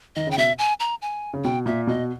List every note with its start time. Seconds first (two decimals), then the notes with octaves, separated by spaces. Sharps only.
0.16 D#3 D#5
0.27 C#3 G5
0.38 B2 E5
0.59 G#5
0.80 A#5
1.02 G#5
1.34 C#3
1.44 B2 G5
1.66 A#2 E5
1.87 B2 D#5